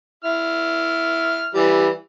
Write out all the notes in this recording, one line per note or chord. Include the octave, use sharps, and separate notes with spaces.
E4 F6
E3 G3